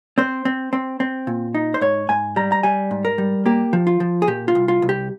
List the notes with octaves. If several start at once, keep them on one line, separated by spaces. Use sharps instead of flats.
C4 C5
C4
C4
C4
A#2
D#4
C5
G#2 C#5
G#2 G#5
G3 A#5
A#5
G3 G#5
G#2
A#4
G3
A#3 G4
F3
F4
F3
G#4
A#2 G4
F4
C2
F4
C2
G4